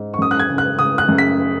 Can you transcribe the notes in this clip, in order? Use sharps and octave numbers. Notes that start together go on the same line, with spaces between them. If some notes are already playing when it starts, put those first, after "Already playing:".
Already playing: G#2
C#6
F#2 D#6
F#6
G#6
C#3
F#6
C#3 D#6
F#6
F#2
B6